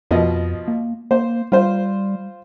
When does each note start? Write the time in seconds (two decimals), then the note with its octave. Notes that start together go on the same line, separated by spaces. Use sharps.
0.11 F2 B2 F3 D#5
0.68 A#3
1.11 A#3 C5
1.52 G3 F4 C5